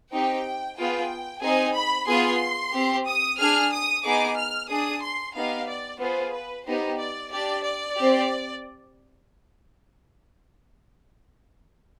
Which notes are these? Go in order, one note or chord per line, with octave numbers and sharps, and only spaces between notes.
C4 D#4 G4 G5
B3 F4 G#4 G5
C4 D#4 G#4 G#5
B5
B3 F4 G#4 C6
C4 G4
D#6
D4 G#4 F6
D#6
B3 D#4 G#4 D6
F6
D4 G#4 D#6
C6
B3 D#4 G4 F5
D5
B3 F4 G#4 C5
B4
B3 D#4 G4 C5
D5
D4 G4 D5
D5
C4 G4